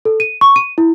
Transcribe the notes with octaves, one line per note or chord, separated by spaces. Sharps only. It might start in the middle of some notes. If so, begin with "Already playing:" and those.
A4
D#7
C#6
D#7
E4